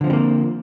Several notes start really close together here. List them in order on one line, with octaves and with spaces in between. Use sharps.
D3 F3 C4 G3 A#3